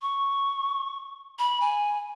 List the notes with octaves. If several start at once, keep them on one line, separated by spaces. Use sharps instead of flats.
C#6
B5
G#5